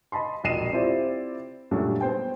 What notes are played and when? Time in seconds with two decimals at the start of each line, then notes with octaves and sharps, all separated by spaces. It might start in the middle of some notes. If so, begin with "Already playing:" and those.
0.12 D#5 A5 B5 C6
0.44 E1 A#1 D#5 C7 D#7 E7
0.72 C4 E4 F4 G4 C5 D5
1.71 F#2 A#2 F#3 G3 A3 D4
2.01 B3 C5 G5